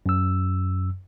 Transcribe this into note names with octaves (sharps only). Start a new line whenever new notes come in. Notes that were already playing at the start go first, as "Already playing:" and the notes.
F#2 E6